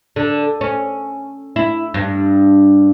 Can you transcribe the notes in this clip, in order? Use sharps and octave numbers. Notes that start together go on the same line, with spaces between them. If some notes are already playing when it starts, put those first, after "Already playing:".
D3
C#4
E4
G2